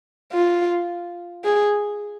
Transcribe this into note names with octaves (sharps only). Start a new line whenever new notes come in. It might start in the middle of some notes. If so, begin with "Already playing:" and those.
F4
G#4